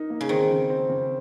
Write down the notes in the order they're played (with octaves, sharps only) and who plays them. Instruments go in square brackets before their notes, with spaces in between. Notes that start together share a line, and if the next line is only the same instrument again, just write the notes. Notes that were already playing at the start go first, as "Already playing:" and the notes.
Already playing: [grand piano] D#4 A#4
A#3
[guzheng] C#3
[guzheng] D#3 [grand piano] C4
[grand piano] C#3
C4
C#3